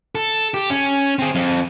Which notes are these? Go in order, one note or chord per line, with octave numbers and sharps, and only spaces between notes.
A4
G4
C#4
C4 G#4
F2